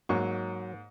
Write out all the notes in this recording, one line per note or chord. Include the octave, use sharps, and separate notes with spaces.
G#2 F#3 A#3 C#6